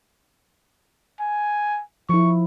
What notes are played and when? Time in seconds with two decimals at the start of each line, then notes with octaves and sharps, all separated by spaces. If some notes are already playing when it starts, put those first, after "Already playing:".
1.20 G#5
2.09 F3 E4 C#6